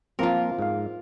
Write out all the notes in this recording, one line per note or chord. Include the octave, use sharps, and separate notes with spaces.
F3 A#3 C4 F4 A#4
G#2 F5